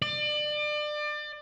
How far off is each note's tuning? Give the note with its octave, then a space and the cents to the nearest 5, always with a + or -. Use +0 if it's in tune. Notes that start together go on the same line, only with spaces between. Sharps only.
D5 +30